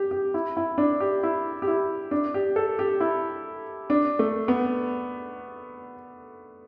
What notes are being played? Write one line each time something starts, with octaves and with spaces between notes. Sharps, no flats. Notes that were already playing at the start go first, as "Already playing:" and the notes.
Already playing: G4
G4
E4
E4
D4
G4
E4
G4
E4
D4
G4
A4
G4
E4
D4
A3
B3